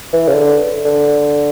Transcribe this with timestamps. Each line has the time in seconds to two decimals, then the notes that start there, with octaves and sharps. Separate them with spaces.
0.13 E3
0.28 C#3
0.34 D3
0.85 D3